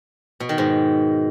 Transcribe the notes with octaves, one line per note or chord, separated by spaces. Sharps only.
B2
D#3
G#2